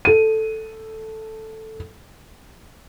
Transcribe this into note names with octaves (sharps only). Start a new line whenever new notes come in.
A4 D#7